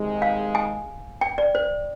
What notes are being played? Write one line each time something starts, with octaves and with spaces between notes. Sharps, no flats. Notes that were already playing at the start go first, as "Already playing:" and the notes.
Already playing: C3 D#3 G#3 D#4
F5
G#5
G5
D5
C5